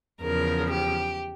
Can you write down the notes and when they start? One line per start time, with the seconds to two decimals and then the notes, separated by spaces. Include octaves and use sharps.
0.22 E2 C#3 F3 A#4
0.72 G4